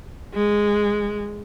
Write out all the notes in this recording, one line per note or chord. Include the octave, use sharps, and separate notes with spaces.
G#3